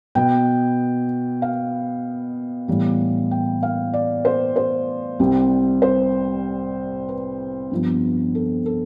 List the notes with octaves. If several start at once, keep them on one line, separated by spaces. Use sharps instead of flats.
B2 B3 G5
F5
A2 E3 G3 B3
G5
F5
D5
C5
C5
C2 C3 G3
C5
B4
G2 F3 B3
A4
A4